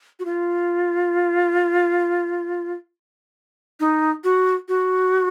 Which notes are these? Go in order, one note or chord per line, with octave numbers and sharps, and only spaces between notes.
F#4
F4
D#4
F#4
F#4